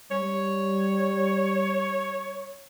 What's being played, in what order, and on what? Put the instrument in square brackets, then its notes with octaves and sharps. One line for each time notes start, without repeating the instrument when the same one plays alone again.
[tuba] G3 [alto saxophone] C#5